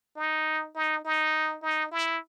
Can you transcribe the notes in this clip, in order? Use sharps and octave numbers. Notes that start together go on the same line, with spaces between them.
D#4
D#4
D#4
D#4
E4